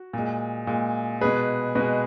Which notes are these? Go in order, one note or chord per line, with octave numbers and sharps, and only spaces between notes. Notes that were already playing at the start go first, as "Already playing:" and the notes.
Already playing: F#4
A#2 G#3
A#2 G#3
B2 G#3 G#4 B4
B2 G#3 B4 D#5